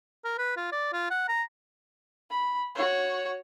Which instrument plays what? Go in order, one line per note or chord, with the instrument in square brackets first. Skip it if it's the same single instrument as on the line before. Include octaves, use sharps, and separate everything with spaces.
[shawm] A#4
B4
F4
D5
F4
F#5
A#5
[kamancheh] B5
F#4 C#5